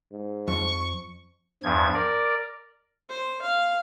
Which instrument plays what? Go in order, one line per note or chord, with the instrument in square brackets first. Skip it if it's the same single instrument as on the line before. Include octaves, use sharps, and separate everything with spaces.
[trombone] G#2
[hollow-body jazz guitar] F2 [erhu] C#6
[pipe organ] E2 G2 F3 G#6
A#4 D5
[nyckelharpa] C5
F5